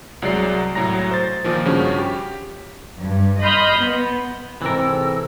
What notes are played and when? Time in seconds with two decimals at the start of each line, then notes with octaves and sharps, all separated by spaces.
0.22 C2 F#3 G#3 D5 C7
0.75 C2 A2 F#3 A#5 A#6
1.11 C5 A6
1.44 A#2 D#3 F3
1.65 G2 C#3 F3 C#4 F#4
1.98 G4
2.98 G2
3.41 D#5 B5 C6 D#6 F6 G6
3.79 B3
4.62 G#2 C3 E3 C4 A4 A#4 E6